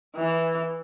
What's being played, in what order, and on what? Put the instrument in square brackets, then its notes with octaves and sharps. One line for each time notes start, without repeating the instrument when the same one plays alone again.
[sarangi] E3